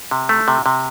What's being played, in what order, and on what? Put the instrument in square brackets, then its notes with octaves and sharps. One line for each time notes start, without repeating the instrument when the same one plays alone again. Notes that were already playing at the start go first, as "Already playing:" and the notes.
[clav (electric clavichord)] C3
A3
C3
C3